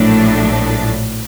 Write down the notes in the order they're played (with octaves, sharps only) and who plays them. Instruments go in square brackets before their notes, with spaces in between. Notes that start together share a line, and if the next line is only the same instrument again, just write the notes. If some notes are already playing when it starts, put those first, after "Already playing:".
Already playing: [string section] A#1 A2 F#3 A3 D4